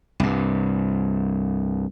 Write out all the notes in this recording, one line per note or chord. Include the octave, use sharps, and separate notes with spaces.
C2 G2